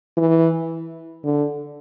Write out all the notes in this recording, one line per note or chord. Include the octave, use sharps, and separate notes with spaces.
E3
D3